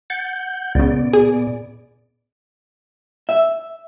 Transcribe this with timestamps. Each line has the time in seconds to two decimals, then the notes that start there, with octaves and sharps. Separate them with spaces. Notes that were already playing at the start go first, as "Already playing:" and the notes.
0.10 F#5 G6 A6
0.75 C#2 A#2 C#3 B3 D5
1.13 G#4
3.29 E5